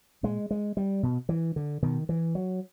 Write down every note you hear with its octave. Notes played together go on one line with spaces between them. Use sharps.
A#2 G#3
G#3
G3
B2
E3
D3
B2 D#3
E3
F#3